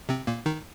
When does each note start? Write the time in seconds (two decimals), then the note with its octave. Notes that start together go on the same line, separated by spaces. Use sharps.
0.09 C3 C4
0.27 A#2 A#3
0.46 D#3 D#4